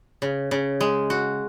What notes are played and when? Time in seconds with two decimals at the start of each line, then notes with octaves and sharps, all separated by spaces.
0.22 C#3
0.51 C#3
0.81 G#3
1.10 F#4